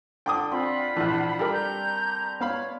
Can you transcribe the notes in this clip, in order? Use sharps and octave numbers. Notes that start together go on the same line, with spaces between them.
D3 G5 D6 D#6
C4 F4 F#5 B5
A#1 E3 D4
G3 G4 A4 A#4
A#5 G6
B3 C#5 F5 B5